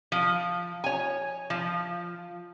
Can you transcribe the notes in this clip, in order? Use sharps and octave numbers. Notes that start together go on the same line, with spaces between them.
F3
C#5 G#5
F3